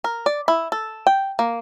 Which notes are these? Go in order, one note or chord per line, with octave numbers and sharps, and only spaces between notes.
A#4
D5
E4
A4
G5
A#3